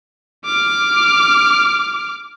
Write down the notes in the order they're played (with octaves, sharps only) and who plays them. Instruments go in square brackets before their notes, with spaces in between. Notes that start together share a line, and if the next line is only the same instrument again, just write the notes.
[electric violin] D6 F6